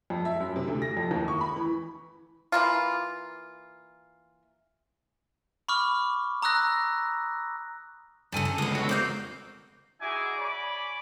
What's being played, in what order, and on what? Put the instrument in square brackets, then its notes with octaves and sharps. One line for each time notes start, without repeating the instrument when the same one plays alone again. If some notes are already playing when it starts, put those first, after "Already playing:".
[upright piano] F2
E5
F#2
C3
D2
A#6
F2
D#2
C#6
B5
E3
[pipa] E3 A#3 F4
[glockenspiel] B5 C#6 D6 F6
A#5 D#6 E6 F#6 A#6
[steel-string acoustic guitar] G2 C#3 [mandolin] A4 G#5 A5
[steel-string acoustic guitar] D3
[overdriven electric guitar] C#2 D3 [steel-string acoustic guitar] B3 F4 [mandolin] D#6 F#6
[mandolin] F#4 E5
[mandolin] A#3 G6 [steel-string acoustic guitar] C4 D5 F5
[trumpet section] D#4 E4 F#4 G#4 G#5 D6
C#5 D5 G#5 B5 C#6 D6